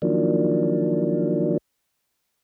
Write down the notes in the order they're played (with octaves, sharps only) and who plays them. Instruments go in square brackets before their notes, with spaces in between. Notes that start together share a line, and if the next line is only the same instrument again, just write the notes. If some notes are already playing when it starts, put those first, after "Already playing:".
[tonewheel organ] D#3 F3 F#3 A#3 D4